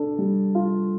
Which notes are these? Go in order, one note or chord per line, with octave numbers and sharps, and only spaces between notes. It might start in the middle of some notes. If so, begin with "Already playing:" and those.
Already playing: D4 A4
G3
F4